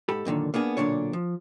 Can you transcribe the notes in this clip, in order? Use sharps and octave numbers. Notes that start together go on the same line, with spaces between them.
G#2 G4 A4 B5
F#2 A#2 D3 D#3
A#3 B3 D4 G#4
B1 F#2 A#2 D3 D4 C#5
F3